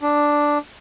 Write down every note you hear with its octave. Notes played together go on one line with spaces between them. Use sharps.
D4